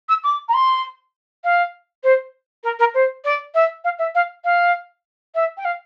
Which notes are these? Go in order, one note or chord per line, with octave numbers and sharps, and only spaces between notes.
E6
D6
A#5
C6
F5
C5
A#4
A#4
C5
D5
E5
F5
E5
F5
F5
E5
G5
F5